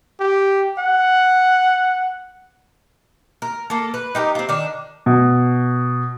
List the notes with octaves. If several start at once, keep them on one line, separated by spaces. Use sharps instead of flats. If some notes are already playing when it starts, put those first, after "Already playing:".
G4
F#5
A#4
A#3 A4
B4
D#4 G4 A#4
C4 F4
D#3 D4
B2